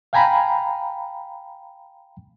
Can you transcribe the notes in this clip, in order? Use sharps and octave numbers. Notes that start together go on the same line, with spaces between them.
F5 G5 G#5 A#5 B5